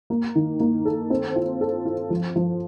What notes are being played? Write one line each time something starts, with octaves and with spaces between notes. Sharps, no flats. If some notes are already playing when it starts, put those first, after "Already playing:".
A#3
D#3
A#3
A4
C4
F4
A4
F4
F3
F3